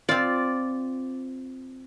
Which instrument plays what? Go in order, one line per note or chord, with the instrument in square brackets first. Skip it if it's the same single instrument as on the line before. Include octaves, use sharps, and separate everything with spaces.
[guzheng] C4 F4 [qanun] D5